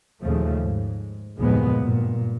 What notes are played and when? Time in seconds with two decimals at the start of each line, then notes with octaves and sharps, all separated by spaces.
0.22 D#2 A#2 C#3 F3 A3
0.59 G#2
1.37 F#1 D#2 A#2 F3 G#3 B3
1.77 G2 A#2